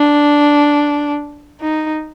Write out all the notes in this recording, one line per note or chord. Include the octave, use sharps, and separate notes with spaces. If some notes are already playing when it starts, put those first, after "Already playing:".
Already playing: D4
D#4